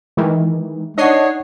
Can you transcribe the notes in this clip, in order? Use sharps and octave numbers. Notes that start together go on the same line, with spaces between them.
D#3 E3 G#3
D4 D#4 C#5 D#5 F#5 C7